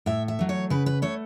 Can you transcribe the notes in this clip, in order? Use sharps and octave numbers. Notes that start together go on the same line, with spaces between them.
A2 E5
E5
F#3 A3
C#5
C#3 B4
B4
A3 C#5